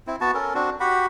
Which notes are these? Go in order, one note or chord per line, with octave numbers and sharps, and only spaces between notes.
C4 E4
B3 F#4 A5
C#4 A4 A#4
C4 D4 F#4
F#4 G4 F#5 B5